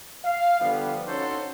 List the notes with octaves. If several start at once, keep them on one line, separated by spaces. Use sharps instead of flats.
F5
D3 F3 G3 B3
C#4 D#4 F#4 A4 C5 C#5